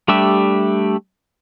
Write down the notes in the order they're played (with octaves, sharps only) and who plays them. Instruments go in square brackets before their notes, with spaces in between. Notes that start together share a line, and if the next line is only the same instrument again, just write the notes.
[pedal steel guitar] G3 A3 D4 G4 E5